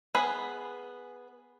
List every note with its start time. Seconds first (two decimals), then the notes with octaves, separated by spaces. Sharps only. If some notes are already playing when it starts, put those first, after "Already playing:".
0.15 B3 G#4 B4 B5